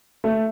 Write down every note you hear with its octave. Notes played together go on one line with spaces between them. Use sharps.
A3